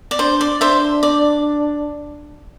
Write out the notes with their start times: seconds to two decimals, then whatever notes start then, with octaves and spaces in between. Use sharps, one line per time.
0.11 D5
0.19 D4 C5
0.41 D5
0.61 D4 C5 E5
1.03 D5